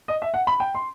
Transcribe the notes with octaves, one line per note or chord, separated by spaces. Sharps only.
D#5
E5
F#5
B5
G5
C6